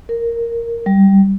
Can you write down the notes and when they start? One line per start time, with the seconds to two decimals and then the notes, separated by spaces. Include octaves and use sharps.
0.09 A#4
0.86 G3